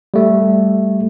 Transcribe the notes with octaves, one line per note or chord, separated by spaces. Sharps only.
G3 A3